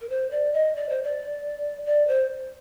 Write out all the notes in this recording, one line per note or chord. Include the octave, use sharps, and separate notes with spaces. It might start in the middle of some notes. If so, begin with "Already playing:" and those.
A#4
C5
D5
D#5
D5
C5
D5
D5
C5